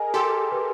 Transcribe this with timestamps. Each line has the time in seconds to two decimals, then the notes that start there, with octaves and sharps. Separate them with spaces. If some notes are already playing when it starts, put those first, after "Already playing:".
Already playing: G#4 A#4 D#5 G#5
0.14 G4 A4 C6
0.52 B4